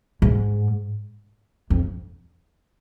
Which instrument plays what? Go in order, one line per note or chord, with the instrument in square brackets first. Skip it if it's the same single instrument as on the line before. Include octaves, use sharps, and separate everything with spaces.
[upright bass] G#2
F2